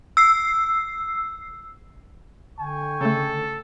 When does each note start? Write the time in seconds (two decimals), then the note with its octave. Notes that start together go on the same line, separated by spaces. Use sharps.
0.17 E6 C7
2.59 D3 G5 G#5 C#6
3.01 C#3 A3 A4